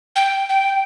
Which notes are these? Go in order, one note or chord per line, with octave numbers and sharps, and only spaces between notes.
G5
G5